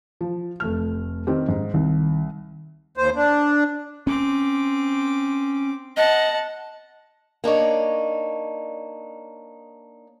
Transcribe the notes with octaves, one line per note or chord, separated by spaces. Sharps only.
F3
F1 A3 F6
D#3 C4 G4
G#2
C2 D#3
D#2 C5
D4
C4 C#4 D6
D#5 F#5 A5
A#3 D4 D#4 C#5